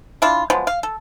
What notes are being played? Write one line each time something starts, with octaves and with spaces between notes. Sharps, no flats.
D4 E4 F4
F3 F#3 G#3 B3
F5
A4